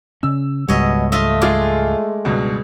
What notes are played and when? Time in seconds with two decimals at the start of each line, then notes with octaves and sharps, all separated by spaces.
0.23 C#3 C#4 E6
0.68 C#2 G#2 B2 G3 C#5 D#5 E5
1.12 A3 F4 D#5 E5
1.42 G#3 F4 D6
2.25 C#2 G2 B2